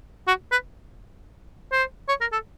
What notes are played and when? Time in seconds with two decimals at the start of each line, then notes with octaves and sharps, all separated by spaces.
0.28 F#4
0.52 B4
1.72 C5
2.09 C#5
2.21 A#4
2.32 A4